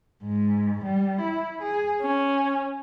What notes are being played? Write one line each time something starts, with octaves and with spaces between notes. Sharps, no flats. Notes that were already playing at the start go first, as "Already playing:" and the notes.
G#2
G3
E4
G#4
C#4